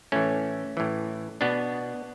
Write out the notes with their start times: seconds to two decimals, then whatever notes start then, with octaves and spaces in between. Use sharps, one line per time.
0.12 A2 E3 A3 C#4
0.77 A2 E3
1.41 B2 B3 D4